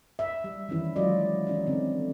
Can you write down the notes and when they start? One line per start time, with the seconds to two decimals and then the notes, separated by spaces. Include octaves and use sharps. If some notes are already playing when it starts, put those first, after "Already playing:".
0.19 E5
0.44 G3
0.69 D#3 E3 C#4 E4
0.96 F#3 G#3 F4 D5 D#5
1.47 E3 C#4 D#4 D5
1.67 D3 C4